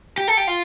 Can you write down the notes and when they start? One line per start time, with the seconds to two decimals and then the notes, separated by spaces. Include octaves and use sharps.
0.18 G4
0.28 A4
0.37 G4
0.47 F4